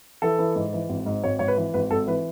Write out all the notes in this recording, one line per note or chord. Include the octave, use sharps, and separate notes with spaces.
E3 A4
E3
G#2
E3
G#1
G#2
G#1 C#5
G#1 C#5
B4
E3
G#1 B4
G#1 A4
E3 B4